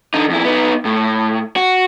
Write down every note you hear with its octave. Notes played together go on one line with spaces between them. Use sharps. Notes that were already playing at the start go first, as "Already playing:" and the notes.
D3 D#4
F2 E4
B3 D#4
A2
F#4